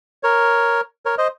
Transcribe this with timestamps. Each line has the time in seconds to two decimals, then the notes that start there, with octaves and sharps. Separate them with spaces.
0.23 A#4 C#5
1.06 A#4 C#5
1.18 C5 D#5